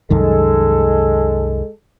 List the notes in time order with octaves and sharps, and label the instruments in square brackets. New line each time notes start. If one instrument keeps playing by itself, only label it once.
[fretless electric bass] C2 F#2 D#3 [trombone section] G#3 A4